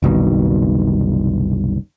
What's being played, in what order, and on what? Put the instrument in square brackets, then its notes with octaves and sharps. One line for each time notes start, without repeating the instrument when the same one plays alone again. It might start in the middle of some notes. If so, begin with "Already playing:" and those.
[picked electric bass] F#1 C2 B2 D#3